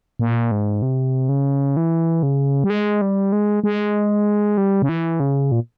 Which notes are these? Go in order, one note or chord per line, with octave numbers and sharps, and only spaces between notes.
A#2
G#2
C3
C#3
E3
C#3
G3
G#3
G3
G#3
G#3
G3
C#3
E3
C#3
A#2